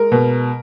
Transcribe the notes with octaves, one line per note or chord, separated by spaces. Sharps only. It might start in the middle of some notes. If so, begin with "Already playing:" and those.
Already playing: G#3 A#4
B2